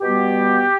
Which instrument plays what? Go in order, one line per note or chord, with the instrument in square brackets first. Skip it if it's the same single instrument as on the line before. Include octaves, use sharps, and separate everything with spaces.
[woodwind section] B2 G3 B3 G4